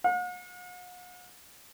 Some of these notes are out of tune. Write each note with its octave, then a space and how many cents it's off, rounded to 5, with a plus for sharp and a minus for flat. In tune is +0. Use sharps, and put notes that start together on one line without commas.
F#5 -45